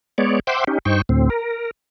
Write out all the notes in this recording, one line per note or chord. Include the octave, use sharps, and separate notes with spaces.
G#3 B3 C#5 D5
C5 E5 F#5 G5 C6 D6
C#4 D#4 G4
G2 D#4 C5 G5 C#6
D2 A2 C4
A#4